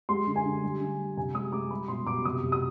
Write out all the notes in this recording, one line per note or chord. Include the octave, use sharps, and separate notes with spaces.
G#3 C6
D3
G#5
D3
G3
D3
G3
C3 G#5
G#3 D#6
G#3 D6
G3 B5
B2 C6
B2 D6
C3 D#6
C3
D#6